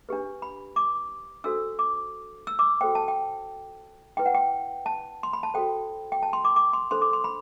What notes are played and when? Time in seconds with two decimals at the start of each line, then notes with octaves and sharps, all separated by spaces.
0.09 D4 G4 B4
0.42 B5
0.76 D6
1.44 D4 F#4 A4 C5 E6
1.79 D6
2.47 E6
2.59 D6
2.81 F#4 A4 C5 G5
2.95 A5
3.08 G5
4.17 E4 B4 G5
4.26 F#5
4.34 G5
4.86 A5
5.23 C6
5.33 B5
5.43 A5
5.54 F#4 A4 C5 G5
6.12 G5
6.23 A5
6.33 C6
6.45 D6
6.56 D6
6.73 C6
6.91 D4 A4 C5 C6
7.02 D6
7.13 C6
7.24 B5